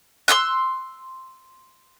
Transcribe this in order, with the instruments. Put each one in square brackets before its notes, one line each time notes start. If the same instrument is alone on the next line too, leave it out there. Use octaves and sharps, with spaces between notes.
[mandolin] C6 D#6 E6 F#6